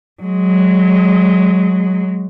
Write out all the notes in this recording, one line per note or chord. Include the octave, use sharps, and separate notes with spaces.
F#3 G#3